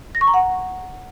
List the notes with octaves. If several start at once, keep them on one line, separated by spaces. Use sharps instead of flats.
A#6
C#6
A#5
F#5